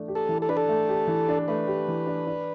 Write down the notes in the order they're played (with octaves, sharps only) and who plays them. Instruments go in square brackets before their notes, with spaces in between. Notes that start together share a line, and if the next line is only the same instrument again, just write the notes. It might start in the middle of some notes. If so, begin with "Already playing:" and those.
Already playing: [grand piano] E3 A3 D4
G4
[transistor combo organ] A4
[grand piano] E3
[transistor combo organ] A4
[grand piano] D4 [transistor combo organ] B4
[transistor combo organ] A4
[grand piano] A3
G4
E3
D4
[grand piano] A3 [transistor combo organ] B4
[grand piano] G4
E3
D4
D4